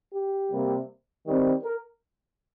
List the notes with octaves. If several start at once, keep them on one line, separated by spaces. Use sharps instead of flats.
G4
C3 G3 A#3
D#3 G3 C4
A#4